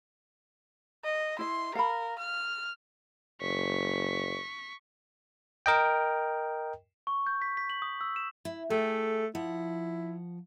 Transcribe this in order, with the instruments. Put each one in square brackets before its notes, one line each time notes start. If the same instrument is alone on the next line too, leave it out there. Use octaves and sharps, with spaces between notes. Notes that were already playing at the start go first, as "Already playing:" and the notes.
[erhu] D#5
[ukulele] E4 D#5 [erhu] C6
[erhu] A#4 [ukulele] F5 B5
[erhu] F6
[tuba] F#1 [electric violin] C#6 B6
[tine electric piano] A#4 D#5 G5
[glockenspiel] C#6
G6
B6
B6
F#7
D#6
E6
E7
[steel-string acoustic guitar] E4
[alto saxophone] A3 [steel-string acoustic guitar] G#4 A4 G5
[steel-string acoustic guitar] F3 F#5 [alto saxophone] E4